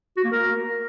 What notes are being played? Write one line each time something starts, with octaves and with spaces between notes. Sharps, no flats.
F#4
A#3
A#4